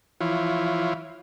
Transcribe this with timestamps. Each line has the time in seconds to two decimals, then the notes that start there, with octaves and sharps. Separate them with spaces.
0.21 E3 F3 E4 F4 C#5